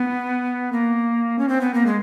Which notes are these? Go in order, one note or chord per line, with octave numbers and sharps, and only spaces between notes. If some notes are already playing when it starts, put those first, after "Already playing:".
Already playing: B3
A#3
C#4
C4
B3
A#3
G#3